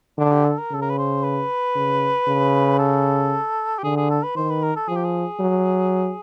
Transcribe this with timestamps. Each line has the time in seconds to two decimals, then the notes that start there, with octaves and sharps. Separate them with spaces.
0.18 D3 D4
0.32 G4
0.45 A4
0.58 A#4
0.71 C#3 A4
0.82 A#4
0.89 B4
0.98 C5
1.23 B4
1.75 C#3
2.28 C#3
2.79 A4
3.78 G4
3.84 D3 G#4
3.97 G#4
4.10 A4
4.23 B4
4.36 D#3 C5
4.50 B4
4.63 A#4
4.76 A4
4.88 F3 G#4
4.96 G4
5.04 G#4
5.40 F#3